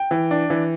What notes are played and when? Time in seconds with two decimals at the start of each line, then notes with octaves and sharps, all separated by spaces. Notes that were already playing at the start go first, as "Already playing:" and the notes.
Already playing: G5
0.11 E3
0.31 D4
0.50 E3